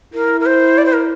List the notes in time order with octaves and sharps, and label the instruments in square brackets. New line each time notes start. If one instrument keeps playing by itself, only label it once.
[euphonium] E4 [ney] A#4
[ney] A#4
C5
D5
C5
A#4